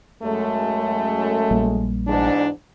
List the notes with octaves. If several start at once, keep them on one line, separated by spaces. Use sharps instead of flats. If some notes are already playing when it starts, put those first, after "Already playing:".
F#2 G#3 A3
A#1 G3 A#3
E2 G#2 D4